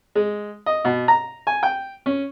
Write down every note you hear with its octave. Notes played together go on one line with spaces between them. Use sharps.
G#3
D#5
B2
A#5
G#5
G5
C#4